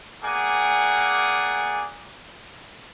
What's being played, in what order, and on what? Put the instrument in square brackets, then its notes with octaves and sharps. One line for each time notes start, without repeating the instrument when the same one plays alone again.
[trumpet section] A#3 G#4 D5 F#5 G#5 D6